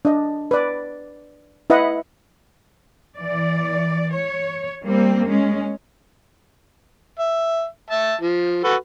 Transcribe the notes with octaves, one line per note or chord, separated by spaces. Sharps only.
D4 D#5
B4 D5
E4 B4 D#5 E5 F#5
E3 D5
C#5
G3 A#3 C4
G#3 C#4
E5
E5 A5
F3
F#4 A4 B4